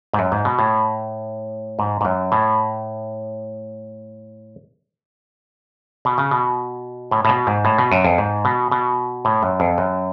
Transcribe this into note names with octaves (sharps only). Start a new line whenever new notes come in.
G#2
F#2
G#2
B2
A2
G#2
G#2
F#2
A2
B2
C#3
B2
A2
A2
B2
G#2
A2
B2
F#2
F2
G#2
B2
B2
A2
F#2
F2
F#2